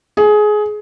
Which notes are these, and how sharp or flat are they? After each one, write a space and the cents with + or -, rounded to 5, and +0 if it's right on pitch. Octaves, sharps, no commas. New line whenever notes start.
G#4 +20